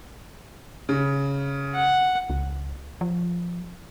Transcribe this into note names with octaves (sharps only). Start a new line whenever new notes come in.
C#3
F#5
C#2
F3